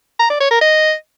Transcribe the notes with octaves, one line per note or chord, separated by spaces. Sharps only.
A#5
D5
C#5
A#4
D#5